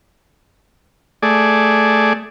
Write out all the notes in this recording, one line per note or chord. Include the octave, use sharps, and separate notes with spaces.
A3 G#4 D5